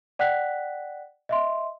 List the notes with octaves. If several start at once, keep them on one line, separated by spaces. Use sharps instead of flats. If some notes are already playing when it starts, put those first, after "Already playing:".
D5 F#5 G5 F#6 B6
D#5 E5 C6